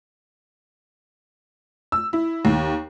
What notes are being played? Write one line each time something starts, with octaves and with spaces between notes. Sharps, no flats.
E6
E4
D#2